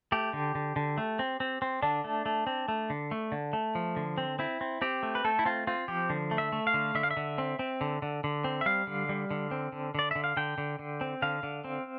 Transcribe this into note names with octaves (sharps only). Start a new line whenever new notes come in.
A3 G4
D3
D3
D3
A3
C4
C4
C4
D3 D4
A3
A3
C4
A3
D3
A3
D3
A3
F3
D3
C4
C4 E4
C4
C4 G4
A3
B4
A3 A4
E4
C4 F4
C4 F4
F3 G4
D3
A3
E5
A3
F5
D3
D3 E5
F5
E5
D3
C4
C4
D3
D3
D3
C4
E5
G3 F5
D3
G3
D3
C4
D3
D3 D5
D3 E5
F5
D3 G5
D3
D3
C4
D3 F5
D3
C4